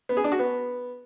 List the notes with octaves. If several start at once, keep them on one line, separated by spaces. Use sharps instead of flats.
B3
G#4
D4
F#4
B3